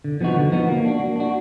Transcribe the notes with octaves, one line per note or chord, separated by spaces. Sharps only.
D3
F3 B3 D#4 F#4
D3
F3 B3 D#4 F#4
A#3
D4 F#4
A#3
D4 F#4